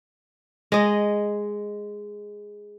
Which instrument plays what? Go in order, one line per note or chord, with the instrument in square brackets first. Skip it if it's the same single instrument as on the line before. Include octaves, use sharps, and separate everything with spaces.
[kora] G#3 D#5